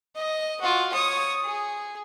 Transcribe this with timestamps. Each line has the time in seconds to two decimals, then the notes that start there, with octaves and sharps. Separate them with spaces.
0.16 D#5
0.61 F4 F#4
0.93 C#5 D#6
1.44 G#4